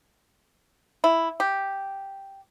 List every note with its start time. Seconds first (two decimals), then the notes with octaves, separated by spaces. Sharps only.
1.04 E4
1.40 G4